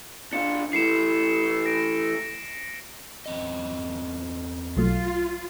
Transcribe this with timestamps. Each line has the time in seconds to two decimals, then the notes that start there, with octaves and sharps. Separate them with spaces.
0.33 D4 F4 C#7
0.73 E3 A3 C7 C#7 E7
1.66 A#6 C7 D7
3.26 E2 C4 D#5
4.77 B1 F#3 A3 F4